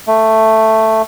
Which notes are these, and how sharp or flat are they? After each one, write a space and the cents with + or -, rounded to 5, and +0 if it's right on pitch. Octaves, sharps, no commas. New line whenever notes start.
A3 +5